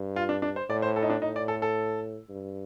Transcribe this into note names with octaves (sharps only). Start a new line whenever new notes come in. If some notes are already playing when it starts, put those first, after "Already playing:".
Already playing: G2
F4
D4
D4
C5
A2 D5
C5
A4
D#4
D4
A2 D#4
D5
A4
A4
G2